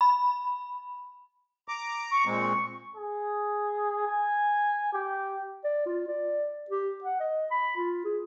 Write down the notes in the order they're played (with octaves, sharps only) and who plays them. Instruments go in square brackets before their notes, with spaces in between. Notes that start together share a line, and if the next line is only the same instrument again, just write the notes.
[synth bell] B5
[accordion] A#5 D6
[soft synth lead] C#6
[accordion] A#2 G#3 C4
[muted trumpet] G#4
G#5
G4
[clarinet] D5
F4
D5
G4
F#5
D#5
B5
F4
G#4